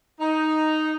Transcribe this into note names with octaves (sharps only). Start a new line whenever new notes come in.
D#4